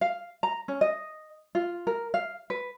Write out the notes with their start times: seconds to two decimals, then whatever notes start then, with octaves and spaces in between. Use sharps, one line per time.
0.01 F5
0.43 A#5
0.68 C#4
0.81 D#5
1.55 F4
1.87 A#4
2.14 F5
2.50 B4